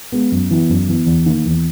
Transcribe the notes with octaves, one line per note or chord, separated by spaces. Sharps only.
G#3 B3
F#2
E3 B3
F#2
E3 B3
E2
D#3 A#3
E2